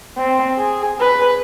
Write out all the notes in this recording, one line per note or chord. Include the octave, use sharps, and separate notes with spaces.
C4
G#4
B4